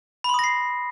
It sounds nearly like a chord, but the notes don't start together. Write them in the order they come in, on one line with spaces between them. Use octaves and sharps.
B5 C6 D#6 A#6 C7